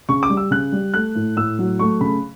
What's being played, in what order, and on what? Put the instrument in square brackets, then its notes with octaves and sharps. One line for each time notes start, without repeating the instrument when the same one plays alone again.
[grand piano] C#3 C#6
D6
G3
E6
C#3 F#6
G3
A3 F#6
A2
A2 E6
F#3
A3 C#6
C#3 B5